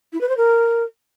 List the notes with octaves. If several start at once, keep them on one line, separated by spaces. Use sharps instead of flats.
E4
B4
C5
A#4